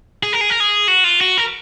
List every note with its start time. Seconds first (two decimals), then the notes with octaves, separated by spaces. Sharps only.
0.23 G#4
0.33 A#4
0.41 G#4
0.50 A#4
0.60 G#4
0.88 F#4
1.04 F4
1.21 F#4
1.38 A#4